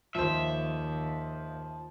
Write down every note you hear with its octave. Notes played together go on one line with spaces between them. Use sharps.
D#2 F3 C5 E5